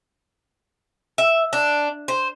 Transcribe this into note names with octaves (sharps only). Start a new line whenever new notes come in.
E5
D4
C5